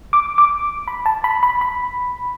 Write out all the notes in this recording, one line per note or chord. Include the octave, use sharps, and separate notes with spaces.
D6
D6
B5
A5
B5
B5
B5